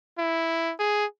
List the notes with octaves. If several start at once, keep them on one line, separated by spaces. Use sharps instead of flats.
E4
G#4